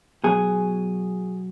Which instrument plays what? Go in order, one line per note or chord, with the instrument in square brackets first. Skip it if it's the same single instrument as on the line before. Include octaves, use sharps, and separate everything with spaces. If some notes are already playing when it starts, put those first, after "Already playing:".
[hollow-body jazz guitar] B2 F#3 G#4